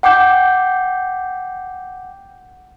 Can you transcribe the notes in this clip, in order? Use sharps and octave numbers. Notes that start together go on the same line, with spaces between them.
F#5 G5 D6 G6